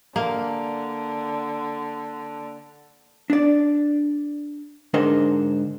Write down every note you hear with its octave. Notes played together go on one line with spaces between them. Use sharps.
D3 A#3
D4 D5
G#2 D3 D4 A#4 C5 D#5